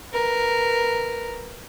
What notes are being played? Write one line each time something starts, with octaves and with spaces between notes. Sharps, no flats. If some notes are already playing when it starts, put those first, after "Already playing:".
A#4 B4